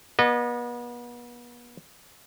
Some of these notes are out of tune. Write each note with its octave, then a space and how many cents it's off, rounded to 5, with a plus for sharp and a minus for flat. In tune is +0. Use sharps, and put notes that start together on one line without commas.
B3 -35 D#5 -35